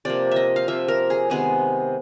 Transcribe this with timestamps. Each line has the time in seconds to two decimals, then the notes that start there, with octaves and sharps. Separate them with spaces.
0.05 C3 F3 A#3 D5
0.31 D#5 E5
0.56 F5
0.68 C3 F3 A#3 E5
0.88 A#4
1.10 G#4
1.30 C3 D#3 G#3 B3 G#4